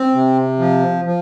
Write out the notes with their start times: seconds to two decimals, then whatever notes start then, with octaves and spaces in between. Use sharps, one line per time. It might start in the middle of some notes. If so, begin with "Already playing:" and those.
Already playing: C4
0.14 C3
0.59 F3
1.05 F3